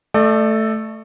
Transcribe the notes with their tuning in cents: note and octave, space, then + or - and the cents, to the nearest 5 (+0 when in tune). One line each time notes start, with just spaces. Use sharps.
A3 +0 A4 +0 D5 +40